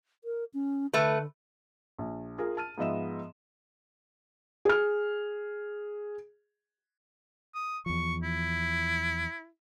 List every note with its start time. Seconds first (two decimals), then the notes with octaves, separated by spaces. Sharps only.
0.24 A#4
0.54 C#4
0.93 D3 A3 B4
1.98 A#1
2.38 F4 G#4 A#4
2.57 A5 F6 D#7
2.78 G#2 F3 B3 D#5 E5 E7
4.65 G#4 F6
7.55 D#6
7.86 E2 F3 C#6
8.23 E4